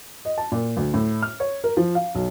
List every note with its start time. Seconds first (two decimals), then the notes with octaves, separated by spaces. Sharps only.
0.25 D#5
0.38 A5
0.52 A#2
0.77 D2
0.94 A2
1.22 F6
1.40 C#5
1.64 A#4
1.77 F3
1.95 F5
2.15 B1